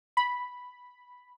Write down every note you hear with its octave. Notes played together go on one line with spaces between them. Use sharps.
B5